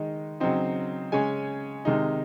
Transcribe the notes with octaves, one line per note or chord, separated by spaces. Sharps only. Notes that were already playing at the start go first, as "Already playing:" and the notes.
Already playing: D#3 G#3 D#4
C#3 F#3 C4 D#4
C#3 G#3 C#4 G#5
C3 D#3 G#3 D#4